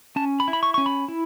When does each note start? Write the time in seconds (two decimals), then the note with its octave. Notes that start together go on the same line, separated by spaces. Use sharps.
0.16 C#4 A5
0.40 B5
0.48 E4
0.53 B5
0.63 C#6
0.74 C#4 C#6
0.86 B5
1.08 E4